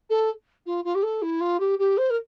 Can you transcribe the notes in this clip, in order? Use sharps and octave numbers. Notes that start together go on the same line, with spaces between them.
A4
F4
F4
G4
A4
E4
F4
G4
G4
C5
A#4